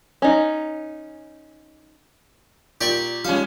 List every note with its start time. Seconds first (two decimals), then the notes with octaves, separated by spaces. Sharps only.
0.22 C#4 D#4
2.81 A#2 G4 D5 C#6
3.25 F3 G3 G#3 C#4 F5